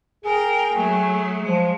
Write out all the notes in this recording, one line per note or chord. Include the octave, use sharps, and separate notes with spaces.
G#4 A#4 G5
F#3 A3
F3 G#3